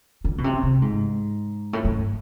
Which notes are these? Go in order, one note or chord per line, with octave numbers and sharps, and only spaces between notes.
D3
B2
C3
C3
G#2
A2
G#2